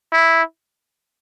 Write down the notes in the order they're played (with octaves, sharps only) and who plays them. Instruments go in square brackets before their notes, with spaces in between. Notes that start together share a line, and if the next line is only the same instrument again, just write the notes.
[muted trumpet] E4